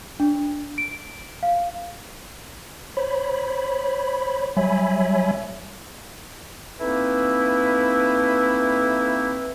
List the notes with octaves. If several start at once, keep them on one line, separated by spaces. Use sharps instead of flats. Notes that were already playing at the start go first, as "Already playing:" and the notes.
D4
D7
F5
C5 C#5 B5
F#3 G3 C#5 E5 G#5 B5
A3 A#3 C4 D#4 E4 B4